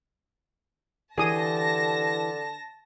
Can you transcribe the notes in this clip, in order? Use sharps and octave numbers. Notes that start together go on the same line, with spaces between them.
D3 E3 G4 G#4 A5 D#6 A#6